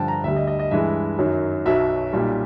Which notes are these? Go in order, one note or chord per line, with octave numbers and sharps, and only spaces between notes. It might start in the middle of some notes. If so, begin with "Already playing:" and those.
Already playing: G2 D3 F3 G5 A5
A#5
D2 D3 G3 E5
D#5
D#5
D#5
G2 E3 G#3 E5
F#2 D#3 F#3
B1 B2 F#3 E5
B1 A#2 G3